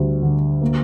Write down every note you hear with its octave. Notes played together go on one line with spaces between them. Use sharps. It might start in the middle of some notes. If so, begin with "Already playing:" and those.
Already playing: D2 G3
D3
A#3